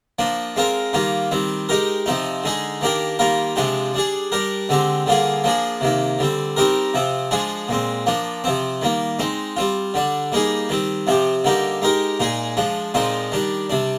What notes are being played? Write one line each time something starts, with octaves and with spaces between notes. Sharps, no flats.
F3 A#3 D4
G#3 C4 F4 A#4
D#3 G3 A#3 F4
D#3 G3 C4
G#3 D#4 G4 A#4
C3 F3 C4 D#4
D3 G#3 D#4 G#4
D#3 A#3 D4 G4 A#4
D#3 G3 A#3 F4 A#4
C3 F3 G#3 D4 G4
G3 D4 G#4
G3 D4 G4 A#4
D3 G#3 C4 G4
D3 G3 A#3 F4 G#4
F3 A#3 D4 G#4
C3 D#3 A#3
D3 G3 C4
G3 C4 D#4 G4 A#4
C3 F3 C4
F3 G#3 D4 G#4
A#2 G#3 C4
F3 A#3 D4
C3 F3 C4
D#3 G3 A#3
G#3 C4 D#4
G3 C4 F4
D3 G3 D4
G3 A#3 D#4 G#4
D#3 G3 C4
C3 F3 C4 G4
D3 G3 A#3 D#4 G4
G#3 D#4 G4 A#4
A#2 G#3 D#4 G#4
F3 G#3 D4
A#2 F3 G#3 C4 D#4
D#3 G3 D4
C3 G3 D4